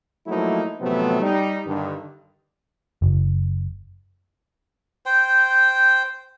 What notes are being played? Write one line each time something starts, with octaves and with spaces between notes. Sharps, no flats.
F3 F#3 A3 A#3 D#4 E4
A1 C3 F3 F#3 A3 B3
G3 D#4
G2 D3 D#3
F#1
C5 G5